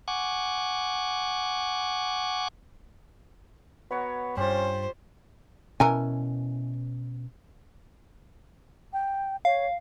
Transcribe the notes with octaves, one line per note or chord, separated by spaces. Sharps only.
F#5 G#5 C#6 D6
B3 F#4 C#5 A#5
G2 C#4 F4 G4 C5
B2 E3 C#4 A#4 G#5
G5
C#5 F5